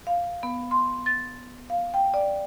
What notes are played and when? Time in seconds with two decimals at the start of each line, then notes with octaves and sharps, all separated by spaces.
0.07 F5
0.43 B3
0.71 C6
1.06 A6
1.70 F5
1.94 G5
2.14 D5